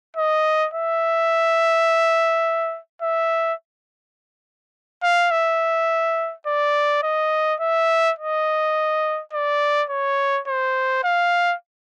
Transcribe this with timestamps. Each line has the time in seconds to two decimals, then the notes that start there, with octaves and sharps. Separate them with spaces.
0.16 D#5
0.74 E5
3.02 E5
5.03 F5
5.31 E5
6.47 D5
7.03 D#5
7.60 E5
8.19 D#5
9.33 D5
9.89 C#5
10.48 C5
11.04 F5